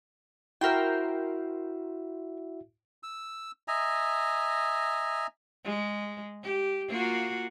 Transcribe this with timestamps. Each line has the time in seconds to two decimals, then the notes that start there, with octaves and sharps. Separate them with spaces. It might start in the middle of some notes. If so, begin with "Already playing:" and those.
0.61 E4 F#4 A#4 C5 E5 G5
3.03 E6
3.68 D#5 E5 G#5 A#5
5.64 G#3
6.43 G4
6.88 A#3 F4 F#4